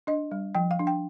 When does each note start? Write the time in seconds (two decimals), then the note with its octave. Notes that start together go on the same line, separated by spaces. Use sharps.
0.07 D4 D#5
0.31 G3
0.55 F3 G5
0.71 F5
0.79 D4
0.87 G5